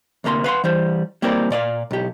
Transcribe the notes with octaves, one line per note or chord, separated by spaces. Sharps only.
D2 C3 A#3 A#5 C6
B4 F5 F#5 C6
E3 G3 C5
G3 A#3 C4 E4 A#4 D5
A#2 D5 D#5 F5
B1 G4